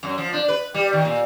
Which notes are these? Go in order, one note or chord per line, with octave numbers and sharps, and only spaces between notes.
F#2
F3
D4
B4
G3
D#3
A#2